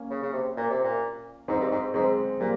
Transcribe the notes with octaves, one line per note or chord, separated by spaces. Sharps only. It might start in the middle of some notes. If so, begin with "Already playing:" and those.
Already playing: A#3 C#4
C#3
C#3
C3
A#2
C3
A#2
G#2 C4 D#4
G2
G#2
G#2 G#3 C4
A#2 G3 A#3